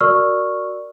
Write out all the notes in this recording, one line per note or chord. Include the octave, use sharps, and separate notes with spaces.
F#4 A#4 D5 C#6 E6 F6